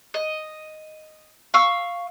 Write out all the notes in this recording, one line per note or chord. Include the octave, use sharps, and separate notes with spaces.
D#5
F5 C#6 E6